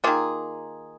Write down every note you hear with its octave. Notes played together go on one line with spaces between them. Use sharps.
D#3 A#3 F4 G#4